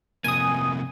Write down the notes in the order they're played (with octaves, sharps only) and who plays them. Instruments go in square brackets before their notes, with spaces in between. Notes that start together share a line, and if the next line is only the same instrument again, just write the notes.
[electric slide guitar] F2 C3 A#3 [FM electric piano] G#5 D#6